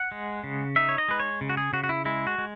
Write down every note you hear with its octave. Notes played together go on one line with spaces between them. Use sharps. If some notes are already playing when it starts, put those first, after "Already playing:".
Already playing: F#5
G#3
C#3
D#4 E5
C#5
D#5
G#3 B4
C#5
C#3
F#4
G#4
C#3 F#4
F#4
E4
G#3 E4
F#4
G#3